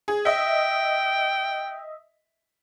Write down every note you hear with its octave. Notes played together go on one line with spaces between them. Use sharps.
G#4
D#5 E5 G5